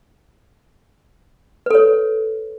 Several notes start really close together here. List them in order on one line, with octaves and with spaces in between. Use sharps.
B4 A4 C#5